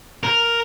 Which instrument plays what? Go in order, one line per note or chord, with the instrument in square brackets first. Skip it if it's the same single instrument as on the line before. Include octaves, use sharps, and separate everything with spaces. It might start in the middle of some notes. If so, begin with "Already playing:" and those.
[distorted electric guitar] A#4